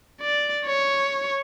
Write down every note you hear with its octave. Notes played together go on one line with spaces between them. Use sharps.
D5
C#5